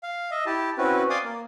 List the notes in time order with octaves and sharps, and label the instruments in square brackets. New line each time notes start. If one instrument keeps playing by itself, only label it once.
[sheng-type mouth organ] F5
D#5 E5
E4 G4 A5
C4 C#4 E4 F#4 B4
D5 F5 G#5 C6 D6 D#6
A#3